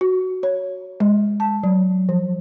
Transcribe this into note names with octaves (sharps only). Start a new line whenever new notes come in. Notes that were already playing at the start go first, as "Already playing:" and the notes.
F#4
C#5
G#3
A5
F#3
F3